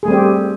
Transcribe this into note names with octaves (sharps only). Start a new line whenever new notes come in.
G3 A3 C4 G4 G#4